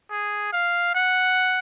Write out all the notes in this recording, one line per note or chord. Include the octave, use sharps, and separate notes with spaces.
G#4
F5
F#5